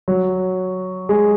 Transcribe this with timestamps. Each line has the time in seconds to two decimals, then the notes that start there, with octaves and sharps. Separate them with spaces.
0.08 F#3
1.09 G#3